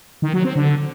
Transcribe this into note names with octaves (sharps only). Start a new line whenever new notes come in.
D#3
F#3
C4
D3